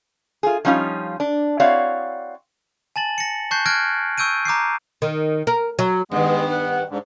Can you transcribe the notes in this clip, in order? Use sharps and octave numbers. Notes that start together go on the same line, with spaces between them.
F4 G#4
F3 G3 C#4 D#4 F4
D4
C4 E4 F#4 C#5 D5 F5
G#5 A5 A6 F#7
A#6 C#7
A5 C#6 F#6 G6 C7
F6 F#6 G#6 A#6 D7
C#6 E6 G6 D7 D#7
A#5 D6 G6 C7
D#3
A#4
F#3
G2 D#3 G#3 B3
F#5
G#2 D3